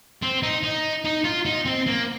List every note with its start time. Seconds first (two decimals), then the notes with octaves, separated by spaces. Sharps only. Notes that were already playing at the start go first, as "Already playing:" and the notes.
0.22 C4
0.43 D#4
0.63 D#4
1.05 D#4
1.24 F4
1.46 D#4
1.66 C4
1.87 A#3